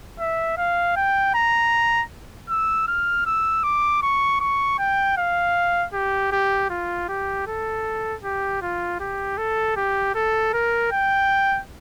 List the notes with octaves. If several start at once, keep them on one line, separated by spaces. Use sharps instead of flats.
E5
F5
G5
A#5
E6
F6
E6
D6
C#6
C#6
G5
F5
G4
G4
F4
G4
A4
G4
F4
G4
A4
G4
A4
A#4
G5